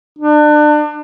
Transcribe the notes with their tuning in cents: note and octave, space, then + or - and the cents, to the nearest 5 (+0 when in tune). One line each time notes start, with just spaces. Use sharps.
D4 +30